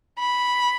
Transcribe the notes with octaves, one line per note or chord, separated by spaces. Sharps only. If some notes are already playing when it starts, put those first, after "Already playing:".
B5